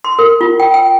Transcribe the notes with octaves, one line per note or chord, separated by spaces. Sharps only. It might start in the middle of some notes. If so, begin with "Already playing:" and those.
C6
A#4
F4
G5
G5